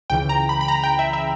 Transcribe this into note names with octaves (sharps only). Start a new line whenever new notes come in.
C#2 C#3 E3 G5
A#5
B5
B5
A#5
G5
E5
E5